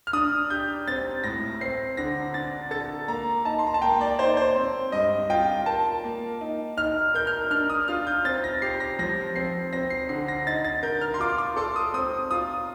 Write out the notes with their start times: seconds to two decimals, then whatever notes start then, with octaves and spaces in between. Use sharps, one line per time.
0.07 F6
0.13 D4 D#6
0.50 G4 G6
0.88 C4 A6
1.24 A2 A#6
1.61 C4 C7
1.97 D3 A#6
2.34 D4 A6
2.71 A4 A6
3.08 A#3 A#5
3.45 D#4 A5
3.59 C6
3.67 A#5
3.74 A5
3.82 A#3 G5
4.01 D5
4.19 D#4 C5
4.37 C5
4.56 C4
4.92 G2 D#5
5.30 F4 G5
5.66 A#4 A5
6.04 A#3
6.41 D#4
6.77 D#4 F6
7.14 A#4 G6
7.27 F6
7.51 D4 F6
7.70 D#6
7.88 F4 F6
8.07 G6
8.24 C4 A6
8.44 A#6
8.62 G4 C7
8.80 A#6
8.99 F3 A#6
9.36 C4 C7
9.73 C4 A#6
9.90 C7
10.09 D3 C7
10.28 A#6
10.47 D#4 A6
10.65 A6
10.83 A#4 G6
11.01 F6
11.14 C6
11.20 F4 D6
11.38 D6
11.56 A4 C6
11.76 D#6
11.94 C4 D#6
12.31 F4 D#6